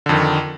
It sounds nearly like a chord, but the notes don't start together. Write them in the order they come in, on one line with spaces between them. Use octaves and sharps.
D3 F2 D#3